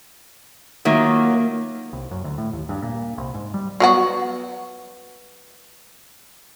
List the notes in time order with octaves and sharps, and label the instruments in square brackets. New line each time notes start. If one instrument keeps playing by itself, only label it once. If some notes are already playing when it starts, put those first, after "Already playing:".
[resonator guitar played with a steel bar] D#3 F#3 [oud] A#3 F4 E5
[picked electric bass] C2
F#2
D2
A2
D#2
G2
A#2
C2
G#2
G3
[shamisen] F#3 B3 F#4